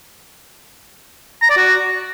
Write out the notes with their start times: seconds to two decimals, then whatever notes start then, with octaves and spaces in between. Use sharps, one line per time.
1.42 A#5
1.50 D5
1.57 F#4